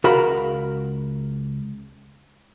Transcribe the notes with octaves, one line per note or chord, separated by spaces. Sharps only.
C#2 F#4 A#4 F5 B5